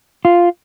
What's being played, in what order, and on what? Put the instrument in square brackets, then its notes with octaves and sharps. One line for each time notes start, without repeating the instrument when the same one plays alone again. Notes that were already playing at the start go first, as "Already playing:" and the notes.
[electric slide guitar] F4